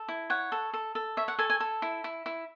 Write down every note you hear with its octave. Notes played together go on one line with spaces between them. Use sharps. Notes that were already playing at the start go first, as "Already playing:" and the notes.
Already playing: A4
E4
C#5 F#5
A4
A4
A4
C#5 E5
F#5
A4 G#5
G#5
A4
E4
E4
E4